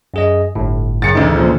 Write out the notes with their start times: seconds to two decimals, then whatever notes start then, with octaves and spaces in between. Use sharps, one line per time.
0.14 F#2 G#4 D#5
0.55 G1 A2
1.02 F#2 C#3 A6 C#7
1.15 E1 A1 D2 D#4
1.36 A#2 D3 F3